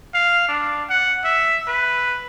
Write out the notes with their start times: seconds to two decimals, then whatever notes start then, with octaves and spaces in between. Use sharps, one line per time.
0.14 F5
0.48 D4
0.90 F#5
1.24 E5
1.68 B4